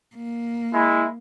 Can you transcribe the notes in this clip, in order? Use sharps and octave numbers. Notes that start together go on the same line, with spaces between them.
A#3
G#3 E4